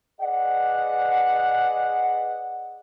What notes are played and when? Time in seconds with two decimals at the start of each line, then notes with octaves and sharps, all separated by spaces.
0.21 G#4 B4 D5 D#5 F#5